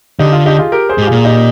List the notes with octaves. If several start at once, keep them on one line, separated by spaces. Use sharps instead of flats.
D3 D#4 G4
F4
D#4 G4
F4 G#4
G4 A#4
G#4 C5
G#2 G4
A#2 F4 G#4
D#4 G4